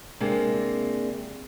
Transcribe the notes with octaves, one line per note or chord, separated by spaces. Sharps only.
C3 G#3 A#3 D4